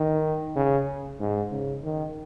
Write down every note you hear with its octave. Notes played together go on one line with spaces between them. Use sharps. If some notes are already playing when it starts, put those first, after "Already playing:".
Already playing: D#3
C#3
G#2
C#3
D#3